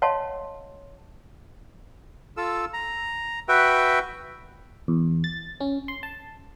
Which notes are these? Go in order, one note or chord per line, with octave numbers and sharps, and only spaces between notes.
C#5 D#5 F5 F#5 A5 C6
F4 A4 E6
A#5
F#4 B4 E5 G5
E2
A6
C#4
C6
A5